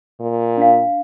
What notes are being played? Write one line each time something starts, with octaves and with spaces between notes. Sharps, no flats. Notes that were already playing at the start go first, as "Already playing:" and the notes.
A#2
D4 F5